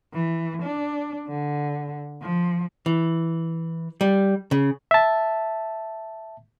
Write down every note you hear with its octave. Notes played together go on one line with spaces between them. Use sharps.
E3
D4
D3
F3
E3
G3
C#3
E5 A5